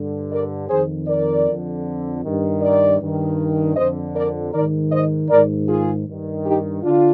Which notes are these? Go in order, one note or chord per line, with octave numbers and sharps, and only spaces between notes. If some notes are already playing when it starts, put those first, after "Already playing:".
Already playing: G2 D3
A#4 D5
F2 D#3 G#4 C5
A#4 D5
F2 D3
G2 D#3
A#4 D5
G2 D#3
F2 D3 C5 D#5
A#4 D5
G#2 D#3 A#4 D5
C5 D#5
G#2 D#3 A#4 D5
F4 G#4
G2 D#3
D#4 G4
D3 D4 F4